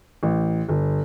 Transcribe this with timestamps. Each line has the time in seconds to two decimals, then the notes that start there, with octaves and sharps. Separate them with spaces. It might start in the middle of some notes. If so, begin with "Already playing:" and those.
0.23 A1
0.69 G1